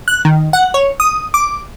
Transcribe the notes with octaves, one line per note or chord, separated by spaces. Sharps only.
F#6
D#3
F#5
C#5
D#6
D6